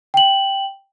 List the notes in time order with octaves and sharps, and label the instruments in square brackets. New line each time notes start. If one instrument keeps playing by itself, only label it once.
[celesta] G5 F#7